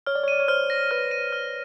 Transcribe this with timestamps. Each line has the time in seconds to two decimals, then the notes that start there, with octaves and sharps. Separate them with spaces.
0.06 C#5 F6
0.15 D5
0.23 C#5
0.28 D5 D#7
0.40 C#5
0.48 C5 F6
0.70 A#6
0.91 B4 F6
1.11 D#7
1.32 F6